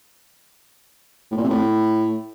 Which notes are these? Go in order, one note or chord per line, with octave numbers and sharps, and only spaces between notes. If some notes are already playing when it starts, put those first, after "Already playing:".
A2
A#2
C3
A2